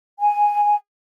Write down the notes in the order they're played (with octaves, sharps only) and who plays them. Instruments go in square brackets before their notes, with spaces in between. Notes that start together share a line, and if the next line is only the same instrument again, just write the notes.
[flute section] G#5